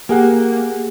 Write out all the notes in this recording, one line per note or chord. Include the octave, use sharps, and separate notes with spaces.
A#3 G4 G#4 F#5